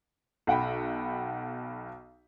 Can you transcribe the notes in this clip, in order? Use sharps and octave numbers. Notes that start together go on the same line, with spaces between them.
B1 F#5 G5 B5